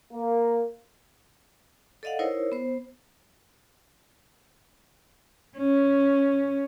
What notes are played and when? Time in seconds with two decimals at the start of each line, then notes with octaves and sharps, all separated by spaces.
0.13 A#3
2.03 A4 D5 D#5 F5 F#5
2.19 D#4 E4 A#4 C5 C#5
2.52 B3 C5
5.58 C#4